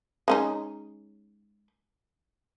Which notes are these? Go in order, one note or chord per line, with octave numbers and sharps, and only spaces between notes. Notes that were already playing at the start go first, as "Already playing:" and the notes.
G#3 C#4 D#4